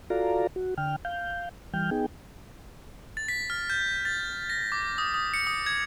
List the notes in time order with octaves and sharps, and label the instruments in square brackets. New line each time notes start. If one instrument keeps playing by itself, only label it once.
[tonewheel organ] F4 F#4 A4 D5 F5 A#5
F#4
D3 G5 F6
F5 G6
E3 G3 G5 F6 G6
B3 D#4 G#4 G5
[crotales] A6
B6
F6
G6
A6
A#6
D6
D#6
D#6
C#7
D#6
G#6